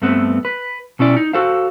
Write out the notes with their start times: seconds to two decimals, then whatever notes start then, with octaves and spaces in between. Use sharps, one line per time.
0.02 G2 A3 B3 C4
0.45 B4
0.99 B2 C#4 E4 D5
1.17 D#4
1.33 F#4 A4 C5 F5